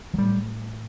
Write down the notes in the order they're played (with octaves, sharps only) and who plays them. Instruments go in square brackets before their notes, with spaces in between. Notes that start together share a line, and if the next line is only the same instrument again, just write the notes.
[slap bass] F#3
[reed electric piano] A2 [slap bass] G3